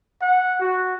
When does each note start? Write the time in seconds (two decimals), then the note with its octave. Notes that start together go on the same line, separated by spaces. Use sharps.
0.21 F#5
0.60 F#4